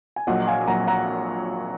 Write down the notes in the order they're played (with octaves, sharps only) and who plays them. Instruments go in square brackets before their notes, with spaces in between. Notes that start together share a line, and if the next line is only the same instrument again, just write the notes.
[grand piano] G#5
[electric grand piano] A#1 A#2 F#3 [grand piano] D#5 F#5
[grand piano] F5 G#5
[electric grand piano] A#1 A#2 F#3 [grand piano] F#5 A#5
[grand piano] F#5 A#5